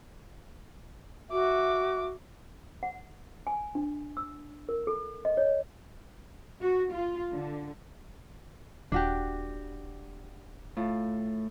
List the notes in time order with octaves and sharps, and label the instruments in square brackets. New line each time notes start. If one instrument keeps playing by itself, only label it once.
[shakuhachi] F#4 [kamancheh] E5 D6
[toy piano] F#5
G#5
D4
E6
A#4
A4
D#5
C#5
[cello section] F#4
F4
D3
[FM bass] D#1 [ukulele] D4 F#4 G4
[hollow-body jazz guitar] A2 F4